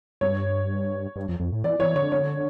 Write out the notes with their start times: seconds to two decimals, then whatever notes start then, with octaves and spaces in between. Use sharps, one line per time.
0.21 G2 C#5
1.16 G2
1.29 F2
1.40 F2
1.52 A2
1.64 E3 D5
1.79 E3 C#5
1.96 D3 C#5
2.12 C#5